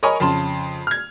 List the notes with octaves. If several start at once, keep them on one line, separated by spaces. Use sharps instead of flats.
A#4 C#5 D#5 G#5 B5 C#6
F2 C#3 A5 C6
F6 G#6